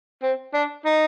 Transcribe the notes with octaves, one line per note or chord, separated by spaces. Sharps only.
C4
D4
D#4